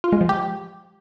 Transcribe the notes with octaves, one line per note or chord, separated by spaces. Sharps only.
F4
G#3
F3
G4